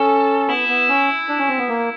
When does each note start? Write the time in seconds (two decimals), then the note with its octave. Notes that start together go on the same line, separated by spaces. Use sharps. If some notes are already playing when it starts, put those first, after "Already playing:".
Already playing: C#4 A4
0.49 B3 E4
0.68 B3
0.89 C#4
1.28 D4
1.39 C#4
1.49 C4
1.58 B3
1.69 A#3